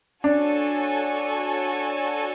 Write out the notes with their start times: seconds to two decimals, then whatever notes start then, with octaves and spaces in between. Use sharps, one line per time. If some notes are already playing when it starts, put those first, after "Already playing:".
0.24 D4 F#4 A4 C#5 G#5